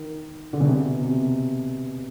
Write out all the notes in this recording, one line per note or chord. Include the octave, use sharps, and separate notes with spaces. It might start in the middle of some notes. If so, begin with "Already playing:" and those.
Already playing: D#3
D3
C#3
C3
B2
C3